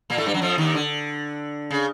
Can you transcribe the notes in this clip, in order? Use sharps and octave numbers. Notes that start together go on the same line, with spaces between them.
A#2 A#3
A2 A3
G2 G3
F#2 F#3
F2 F3
D#2 D#3
D3
C#3